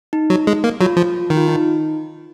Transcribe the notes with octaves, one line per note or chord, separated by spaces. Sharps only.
D#4
F#3
G#3
A#3
F#3 F4
F3
D#3
F4
D#4